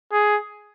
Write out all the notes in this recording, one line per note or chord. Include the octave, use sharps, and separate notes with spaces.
G#4